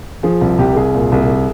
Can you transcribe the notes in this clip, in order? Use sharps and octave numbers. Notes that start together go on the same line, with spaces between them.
F3 G#4
C2
C2 G4
A#4
C2 G#4
A#2
C2